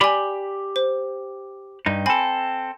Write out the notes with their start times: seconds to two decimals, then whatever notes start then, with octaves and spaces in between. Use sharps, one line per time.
0.01 G4 D5 G#5 B5
0.76 C5
1.86 G2 D#4
2.06 C4 A4 G#5 B5